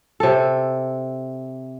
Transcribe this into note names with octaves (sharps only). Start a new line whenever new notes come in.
C3 A4